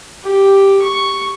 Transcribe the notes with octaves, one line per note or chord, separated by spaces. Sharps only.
G4
C#6